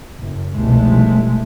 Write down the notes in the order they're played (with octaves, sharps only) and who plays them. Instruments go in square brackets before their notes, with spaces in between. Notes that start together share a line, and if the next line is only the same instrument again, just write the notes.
[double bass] F#1
[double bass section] F1 C2 B2 [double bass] G#3 A3